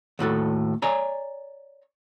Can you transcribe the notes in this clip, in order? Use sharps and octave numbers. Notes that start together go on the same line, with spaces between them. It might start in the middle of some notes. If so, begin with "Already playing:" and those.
D#2 A2 F#4 A4
C#5 D5 G#5 A#5